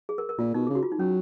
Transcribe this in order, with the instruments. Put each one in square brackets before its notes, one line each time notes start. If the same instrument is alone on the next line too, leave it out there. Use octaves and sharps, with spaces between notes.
[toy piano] G#4
A#4
A#4
[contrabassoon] A#2 [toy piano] F4
[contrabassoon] B2 [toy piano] D#4
[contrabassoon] C#3 [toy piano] G#4
[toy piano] F#4
F4
D#4
[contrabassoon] F#3 [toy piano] C#4